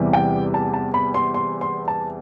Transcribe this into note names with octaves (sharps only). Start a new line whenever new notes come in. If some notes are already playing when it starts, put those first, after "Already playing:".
Already playing: E2 C3 E3 G3
G5
A5
A5
B5
C6
C6
C6
A5